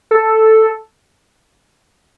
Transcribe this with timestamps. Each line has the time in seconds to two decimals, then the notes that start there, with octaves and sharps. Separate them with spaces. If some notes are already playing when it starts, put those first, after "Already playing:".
0.11 A4